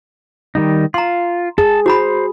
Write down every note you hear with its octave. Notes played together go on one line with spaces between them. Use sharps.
D#3 G3 D#4
F4 A#5 C6
G#4 A5
F#4 C5 A#5 B5